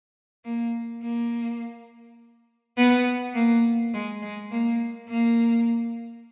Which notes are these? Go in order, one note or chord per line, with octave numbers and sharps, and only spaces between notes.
A#3
A#3
B3
A#3
G#3
G#3
A#3
A#3